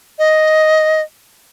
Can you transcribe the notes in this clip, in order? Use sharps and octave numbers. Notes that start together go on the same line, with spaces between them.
D#5